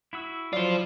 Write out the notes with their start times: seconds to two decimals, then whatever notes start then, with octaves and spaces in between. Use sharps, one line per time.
0.13 E4 F#4 E6
0.53 F#3 F4 C5 D5